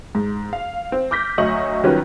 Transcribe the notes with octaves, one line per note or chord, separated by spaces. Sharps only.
G#2
F5
C4
D6 F6 G6 A#6 B6
D2 F#3 D#5 C#6 F#7
D#3 F#3 G3 C#4 F4 B4